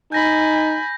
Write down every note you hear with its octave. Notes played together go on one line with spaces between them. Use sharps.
D#4 G#5 B5 G6 A#6